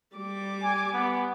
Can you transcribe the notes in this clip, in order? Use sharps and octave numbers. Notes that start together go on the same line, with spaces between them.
G3 D6
G#5
B3